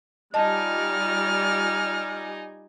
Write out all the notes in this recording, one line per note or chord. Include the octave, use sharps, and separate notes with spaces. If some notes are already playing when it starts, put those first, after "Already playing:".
G3 D#4 F4 D5 D#5 G#5 A5 F6